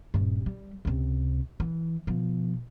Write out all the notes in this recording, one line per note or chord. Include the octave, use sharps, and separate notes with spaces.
D#1 G2
G3
C#2 C3
E3
B2 F3